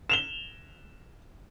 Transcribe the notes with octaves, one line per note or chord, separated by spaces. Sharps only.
E7 F7 G7